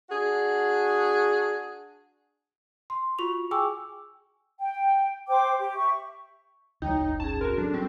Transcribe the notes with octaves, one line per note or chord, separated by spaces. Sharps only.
D4 F#4 G#4
C6
F4 F#4 C#6 F7
G#4 G5 G#5 C#6 D6 E6
G5
C5 G5 D6
G4
E5 C#6
D2 F#3 D#4 C#5 G5
D1 G1
C#4 G#4 A5
C4 F#4 A#4
F#3 D4 A4
G3 C4 C#4